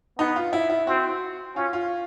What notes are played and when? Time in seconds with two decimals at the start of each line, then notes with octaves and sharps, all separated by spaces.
0.18 B3 D#4
0.36 F4
0.53 E4
0.70 E4
0.87 C4 F#4
1.56 C#4 F4
1.73 F4